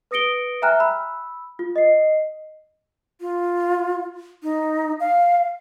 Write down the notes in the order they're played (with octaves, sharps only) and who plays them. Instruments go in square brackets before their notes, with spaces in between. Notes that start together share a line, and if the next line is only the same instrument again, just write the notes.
[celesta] B4 D#6 A#6 C#7 D7 G7
E5 G5 G#5 A#5 F6 F#6
B5 E6
F4
D#5 C7
[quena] F4
D#4
F5